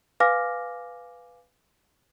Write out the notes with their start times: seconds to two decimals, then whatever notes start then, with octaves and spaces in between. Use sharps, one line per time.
0.20 B4 F5 G#5 D6 F6 A#6